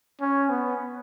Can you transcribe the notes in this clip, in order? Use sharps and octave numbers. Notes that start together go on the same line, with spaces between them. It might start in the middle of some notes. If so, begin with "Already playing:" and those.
C#4
B3